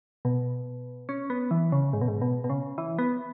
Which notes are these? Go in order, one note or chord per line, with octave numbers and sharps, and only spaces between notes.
B2
C#4
B3
E3
C#3
G#2
B2
G#2
B2
B2
C#3
E3
B3